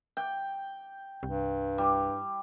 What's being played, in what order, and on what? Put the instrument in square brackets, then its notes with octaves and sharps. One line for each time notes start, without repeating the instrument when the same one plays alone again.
[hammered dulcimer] G5
[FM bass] C2 [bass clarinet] G2
[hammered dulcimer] G3